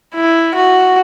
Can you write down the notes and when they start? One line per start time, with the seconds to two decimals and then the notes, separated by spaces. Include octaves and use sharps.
0.15 E4
0.55 F#4